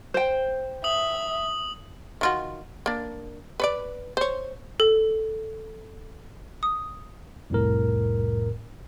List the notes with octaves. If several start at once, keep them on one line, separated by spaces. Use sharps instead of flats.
C5 G5
E5 D#6 F#7
D#3 F4 F#4
A#3 D4
B4 C#5 D5
C5 C#5
A4
D#6
C2 F2 A2 A#4